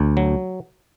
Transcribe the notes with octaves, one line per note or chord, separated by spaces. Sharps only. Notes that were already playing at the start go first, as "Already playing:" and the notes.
Already playing: D2
F#3